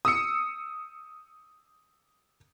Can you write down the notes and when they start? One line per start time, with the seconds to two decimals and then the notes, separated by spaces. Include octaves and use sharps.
0.05 D#6 E6 C#7